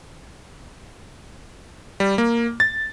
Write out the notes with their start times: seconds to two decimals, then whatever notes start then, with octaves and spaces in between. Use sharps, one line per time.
2.00 G3
2.18 A#3
2.60 A6